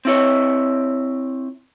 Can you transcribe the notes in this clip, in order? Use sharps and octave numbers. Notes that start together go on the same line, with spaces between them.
C4 E4 C#5